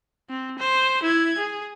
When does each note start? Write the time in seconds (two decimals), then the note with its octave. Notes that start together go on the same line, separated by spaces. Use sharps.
0.30 C4
0.58 C5
1.03 E4 G#6
1.38 G#4